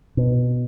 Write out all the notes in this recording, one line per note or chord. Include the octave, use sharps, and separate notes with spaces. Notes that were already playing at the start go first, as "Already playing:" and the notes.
B2